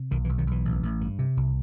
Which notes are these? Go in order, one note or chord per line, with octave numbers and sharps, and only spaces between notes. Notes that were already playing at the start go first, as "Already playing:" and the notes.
Already playing: C3
B1 D#3
E3
B1
D#3 F#3
B1 E3
A1
A1
G2
C3
C2